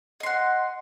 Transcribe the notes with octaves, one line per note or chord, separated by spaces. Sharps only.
D#5 F#5 C6